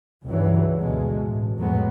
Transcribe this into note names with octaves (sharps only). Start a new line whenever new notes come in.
C#2 G2 C#3 E3 F#3
D2 B2 G#3
A1
F2 A2 F#3 G#3 B3